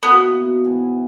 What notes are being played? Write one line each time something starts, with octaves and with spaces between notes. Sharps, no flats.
B2 A#3 B3 E4
B2 A#3 E4
G#2 E3 B3 E4